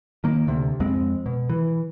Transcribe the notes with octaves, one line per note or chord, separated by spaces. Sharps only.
D#3 A#3
D2 C3
F2 G#3 C4
B2
E3